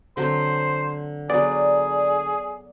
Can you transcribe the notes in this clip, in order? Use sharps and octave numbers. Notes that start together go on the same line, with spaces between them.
D3 F#3 C4 C5
F#3 B3 G#4 D5